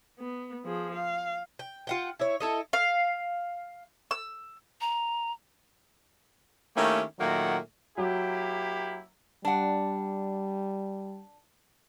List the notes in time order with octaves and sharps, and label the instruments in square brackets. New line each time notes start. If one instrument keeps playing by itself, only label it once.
[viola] B3
F3 G#4
F5
[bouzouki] G5
F4 F#5 G5
E4 C#5
E4 A4 D#5
[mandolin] F5
E6
[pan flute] A#5
[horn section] D#3 A3 A#3 C#4 E4 G4
A#2 D#3 F#3 A3 A#3 F#5
[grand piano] F#3 [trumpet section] A#3 E4 G4
[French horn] G3 [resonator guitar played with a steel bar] D4 F#5